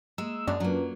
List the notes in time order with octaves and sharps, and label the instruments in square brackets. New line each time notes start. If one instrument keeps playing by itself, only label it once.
[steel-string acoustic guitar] G#3 [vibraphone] A#3 [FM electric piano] E6
[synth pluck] F#2 [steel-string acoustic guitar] G#3 [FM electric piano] D4
[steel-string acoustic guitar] F#3 A#3 [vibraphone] C#4 F4 B4